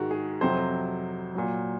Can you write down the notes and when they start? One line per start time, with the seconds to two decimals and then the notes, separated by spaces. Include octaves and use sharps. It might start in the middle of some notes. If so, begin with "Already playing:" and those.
Already playing: G#2 D#3 G#3 F#4
0.11 G#4
0.41 F2 C3 F#3 C5
1.35 A#2 F#3